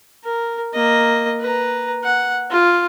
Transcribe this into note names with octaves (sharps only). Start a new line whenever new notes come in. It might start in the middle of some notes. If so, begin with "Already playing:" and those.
A#4
A#3 D#5
B4 A#5
F#5
F4